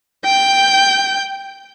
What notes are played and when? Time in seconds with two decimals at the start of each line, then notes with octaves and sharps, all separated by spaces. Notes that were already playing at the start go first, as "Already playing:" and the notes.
0.25 G5 G6